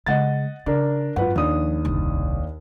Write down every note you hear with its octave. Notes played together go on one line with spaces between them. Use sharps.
C#3 G#3 D#5 F#5 A6
C#3 D4 A#4
G#1 F#2 F4 B4 F#5
D#2 F3 D4 D#6
F#1 C2